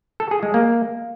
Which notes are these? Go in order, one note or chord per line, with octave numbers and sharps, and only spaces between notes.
A4
G#4
G#3
A#3